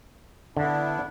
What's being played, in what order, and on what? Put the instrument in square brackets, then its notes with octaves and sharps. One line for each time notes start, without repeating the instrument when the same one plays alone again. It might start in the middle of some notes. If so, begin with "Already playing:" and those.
[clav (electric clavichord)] D3 [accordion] B3 D4 E4